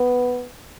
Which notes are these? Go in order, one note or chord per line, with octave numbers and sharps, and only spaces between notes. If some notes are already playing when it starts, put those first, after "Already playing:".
Already playing: B3